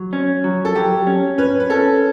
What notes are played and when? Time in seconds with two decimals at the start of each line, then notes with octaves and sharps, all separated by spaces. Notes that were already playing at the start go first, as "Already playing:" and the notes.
Already playing: F#3
0.13 C#4
0.44 F#3
0.65 A4
0.75 F#3 G4
1.07 C#4
1.38 C#4 B4
1.60 B4
1.70 C#4 A4